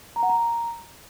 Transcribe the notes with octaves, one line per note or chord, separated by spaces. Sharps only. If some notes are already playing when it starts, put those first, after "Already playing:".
A#5
F#5
A#5